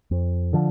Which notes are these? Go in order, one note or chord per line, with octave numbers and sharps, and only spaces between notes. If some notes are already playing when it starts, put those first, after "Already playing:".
F2
D3 F3